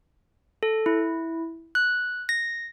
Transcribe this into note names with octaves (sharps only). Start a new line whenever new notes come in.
A4
E4
F#6
A#6